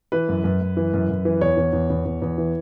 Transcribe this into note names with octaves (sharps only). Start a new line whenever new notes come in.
E3 B4
F#2
F#2
F#2
E3
F#2
F#2
E3
E2 C#5
E2
E2
E2
E2
E2
E3